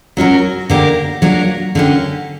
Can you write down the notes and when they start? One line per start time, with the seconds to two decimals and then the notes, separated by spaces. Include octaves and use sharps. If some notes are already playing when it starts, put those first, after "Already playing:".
0.17 F#3 C#4 F#4 A#4
0.70 D3 A#3 D4 G4 A#4
1.22 F#3 A#3 D4 A#4
1.75 D3 A#3 C#4 G4